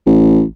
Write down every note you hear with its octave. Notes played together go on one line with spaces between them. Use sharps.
A1